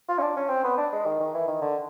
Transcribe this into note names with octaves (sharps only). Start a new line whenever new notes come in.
F4
C#4
D4
C#4
C4
B3
D4
G#3
D#3
D#3
E3
D#3
D3